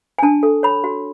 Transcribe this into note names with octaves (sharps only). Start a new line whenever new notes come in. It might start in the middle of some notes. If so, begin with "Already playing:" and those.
G#5
D4 A5
A4
C#5 B5
F#4